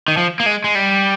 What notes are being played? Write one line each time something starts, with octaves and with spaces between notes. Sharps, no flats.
D#3
F3
A#3
G#3
G#3
G3